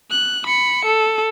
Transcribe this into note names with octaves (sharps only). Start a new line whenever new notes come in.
F#6
B5 C#7
A4